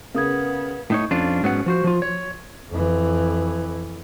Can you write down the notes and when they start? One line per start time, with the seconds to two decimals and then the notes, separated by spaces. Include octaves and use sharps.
0.15 C#3 B3 A#4 D#6 G#6
0.90 A2 D#4 C#5
1.11 F2 C#4 D4 F4
1.43 G#2 F#3 B3 C#4 F#5
1.66 F3 F#4 C5
1.84 F3 F4
2.02 C#5
2.70 F2 E3